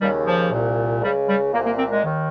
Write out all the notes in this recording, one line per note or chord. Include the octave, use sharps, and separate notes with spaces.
D#2 C#3 G3
F3
C2 A#2
C#2 C#3 G3
G3
C2 A#2 A#3
A#3
C4
G#3
D#2 D#3